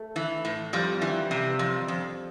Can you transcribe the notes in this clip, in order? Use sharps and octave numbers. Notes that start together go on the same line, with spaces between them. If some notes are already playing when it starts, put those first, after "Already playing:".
Already playing: A3
E3
A2
F2 G3
E3
C3
F2
F2